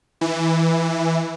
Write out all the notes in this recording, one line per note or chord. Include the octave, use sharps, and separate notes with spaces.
E3